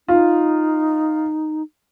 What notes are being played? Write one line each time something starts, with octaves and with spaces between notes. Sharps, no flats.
D#4 F4